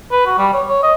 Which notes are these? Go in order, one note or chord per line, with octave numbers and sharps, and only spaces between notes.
B4
F#4
G3
C#5
C#5
D#5